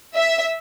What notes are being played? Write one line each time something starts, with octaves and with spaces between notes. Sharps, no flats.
E5